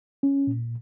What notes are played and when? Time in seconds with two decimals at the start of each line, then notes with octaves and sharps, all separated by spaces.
0.23 C#4
0.47 A#2